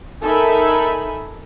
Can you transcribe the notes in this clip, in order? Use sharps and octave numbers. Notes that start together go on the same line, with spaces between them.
D#4 A4 A#4 E5 G#5 B5